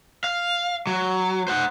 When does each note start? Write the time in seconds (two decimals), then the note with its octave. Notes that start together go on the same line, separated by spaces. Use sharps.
0.24 F5
0.87 F#3
1.48 C5 F#5